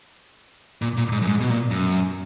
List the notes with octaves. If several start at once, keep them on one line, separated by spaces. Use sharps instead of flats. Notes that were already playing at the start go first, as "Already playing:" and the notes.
A#2
A#2
G#2
F#2
G#2
B2
A#2
F#2